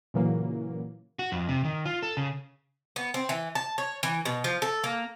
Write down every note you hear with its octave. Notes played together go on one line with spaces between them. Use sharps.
A#2 C#3 E3 F#3 A#3
F#4
F2
C3
D#3
F4
A4
C#3
B3
C4
E3
A5
C#5
E3
B2
F3
A4
A#3